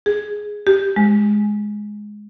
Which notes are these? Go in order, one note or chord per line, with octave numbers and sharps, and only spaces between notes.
G#4
G4
G#3